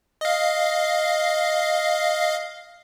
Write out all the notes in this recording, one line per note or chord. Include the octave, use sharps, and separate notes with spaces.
D#5 F5